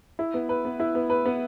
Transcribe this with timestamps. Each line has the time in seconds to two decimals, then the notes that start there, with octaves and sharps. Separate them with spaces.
0.19 E4
0.34 B3
0.49 B4
0.65 B3
0.80 E4
0.95 B3
1.10 B4
1.26 B3